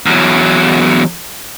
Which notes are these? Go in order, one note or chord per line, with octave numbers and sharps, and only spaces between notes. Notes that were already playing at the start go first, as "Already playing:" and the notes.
E2 F#3